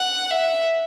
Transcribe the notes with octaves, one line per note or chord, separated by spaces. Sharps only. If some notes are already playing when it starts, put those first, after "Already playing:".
Already playing: F#5
E5